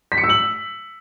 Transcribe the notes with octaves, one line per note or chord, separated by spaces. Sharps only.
B6
C#7
E6
F#7